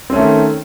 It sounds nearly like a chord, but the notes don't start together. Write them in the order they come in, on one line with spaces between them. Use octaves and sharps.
C4 C#4 A3 D#3